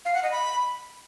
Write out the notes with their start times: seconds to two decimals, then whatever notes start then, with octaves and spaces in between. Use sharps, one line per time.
0.05 F5
0.14 F#5
0.23 D#5
0.32 B5